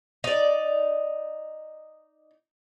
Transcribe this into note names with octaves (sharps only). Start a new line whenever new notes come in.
D#4 D5